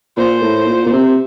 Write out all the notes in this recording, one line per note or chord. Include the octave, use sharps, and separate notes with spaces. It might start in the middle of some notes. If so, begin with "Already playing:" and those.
A#2 C5
A2
A#2
A#2
C3